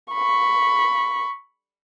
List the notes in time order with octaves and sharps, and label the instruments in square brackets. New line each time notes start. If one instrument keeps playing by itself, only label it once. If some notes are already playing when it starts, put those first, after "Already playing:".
[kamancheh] B5 C#6